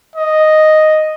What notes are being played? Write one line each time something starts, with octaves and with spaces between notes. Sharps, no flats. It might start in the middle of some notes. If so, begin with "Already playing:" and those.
D#5